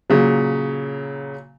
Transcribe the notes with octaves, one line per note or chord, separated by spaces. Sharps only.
A#2 C#3 F#3